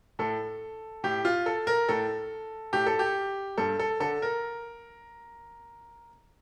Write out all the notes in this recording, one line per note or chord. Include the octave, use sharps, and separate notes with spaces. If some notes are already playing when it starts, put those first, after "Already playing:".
A2 A4
A2 G4
F4
A4
A#4
A2 A4
A2 G4
A4
G4
G2 A4
A4
D3 A4
A#4